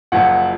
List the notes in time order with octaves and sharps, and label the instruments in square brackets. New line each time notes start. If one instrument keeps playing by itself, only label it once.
[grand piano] F#1 F#2 F3 F#5